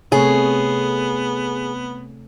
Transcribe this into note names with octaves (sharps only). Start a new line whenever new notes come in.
C3 A3 B3 G#4 C#5